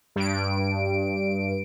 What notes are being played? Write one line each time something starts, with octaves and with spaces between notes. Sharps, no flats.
G2 D7